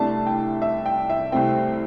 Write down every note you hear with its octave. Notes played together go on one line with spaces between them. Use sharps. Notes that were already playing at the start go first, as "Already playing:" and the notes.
Already playing: C2 C3 A3 D4 E5 A5
G5
E5
G5
E5
C2 C3 A3 C4 G5